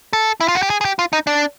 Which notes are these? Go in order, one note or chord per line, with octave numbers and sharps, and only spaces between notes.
A4
E4
F4
F#4
G4
G#4
G#4
G4
F4
D#4
D4